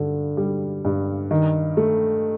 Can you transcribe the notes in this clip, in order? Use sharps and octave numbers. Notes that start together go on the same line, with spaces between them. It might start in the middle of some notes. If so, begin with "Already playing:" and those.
Already playing: G2 D3
G3
G2
D#3
A3